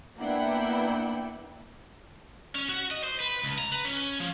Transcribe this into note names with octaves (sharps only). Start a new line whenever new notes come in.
A#3 B3 D4 E4 F#5 G5
C#4
F#4
D#5
C5
B4
C#2
A#5
B4
C#4
F3